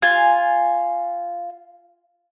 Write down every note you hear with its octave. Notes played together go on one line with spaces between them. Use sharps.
F4 G#5